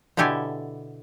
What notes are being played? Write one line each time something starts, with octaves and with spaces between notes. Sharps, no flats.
B2 D3 E4 G4 A4 G#5